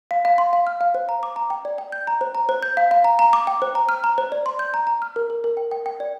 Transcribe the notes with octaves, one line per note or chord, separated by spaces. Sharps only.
F5
F5
C6
F5
F6
F5
C5
A#5
D6
A#5
G5
D5
G5
G6
A#5
C5
A#5
C5
G6
F5
F5
A#5
A#5
D6
G5
C5
A#5
F6
A#5
C5
D5
C6
G6
A#5
A#5
F6
A#4
A#4
A#4
G5
G5
G5
D5